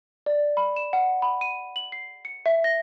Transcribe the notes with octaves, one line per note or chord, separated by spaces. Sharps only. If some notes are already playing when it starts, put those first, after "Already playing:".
D5
B5
E7
F#5
B5
D#7
F#7
C7
C#7
E5
A#6